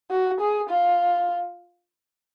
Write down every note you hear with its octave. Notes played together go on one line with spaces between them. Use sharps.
F#4
G#4
F4